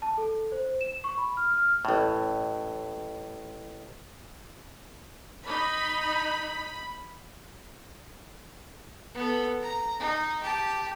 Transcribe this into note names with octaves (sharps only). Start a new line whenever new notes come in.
A5
A4
C5
E7
C#6
B5
F6
F6
A1 A2
D#4 B5
B3 A4
A#5
D#4
G4 A5